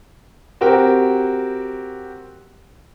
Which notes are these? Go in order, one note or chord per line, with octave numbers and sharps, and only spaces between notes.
C4 F#4 G4 A#4 G5